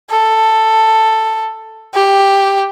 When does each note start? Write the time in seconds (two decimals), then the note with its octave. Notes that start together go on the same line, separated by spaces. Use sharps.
0.10 A4
1.94 G4